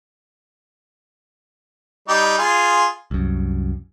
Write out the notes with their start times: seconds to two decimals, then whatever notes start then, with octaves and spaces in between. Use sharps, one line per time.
2.08 G3 D#4 G4
2.38 F4 G#4
3.11 C2 F#2